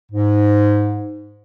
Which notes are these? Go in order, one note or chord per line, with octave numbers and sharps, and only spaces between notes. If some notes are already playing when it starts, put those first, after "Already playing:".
G#2